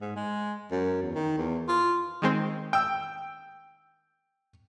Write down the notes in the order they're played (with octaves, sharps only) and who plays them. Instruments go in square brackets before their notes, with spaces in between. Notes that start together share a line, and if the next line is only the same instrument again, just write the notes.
[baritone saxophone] G#2
G#3
F#2
E2
D#3
E2
F4
[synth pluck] D#3 G#3 C4
[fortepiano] G5 E6